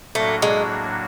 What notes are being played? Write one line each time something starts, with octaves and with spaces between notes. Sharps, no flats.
A2 F#3 A3 A#3 D4 F#4
G#3